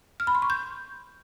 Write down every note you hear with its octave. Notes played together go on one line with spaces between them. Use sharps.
F6
B5
C6
C#6
G6